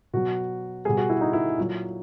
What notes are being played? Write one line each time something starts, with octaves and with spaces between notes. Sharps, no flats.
B2 F#3 F#4
B2 G3 G#4
F#4
E4
D#4
E4
A#2 F#3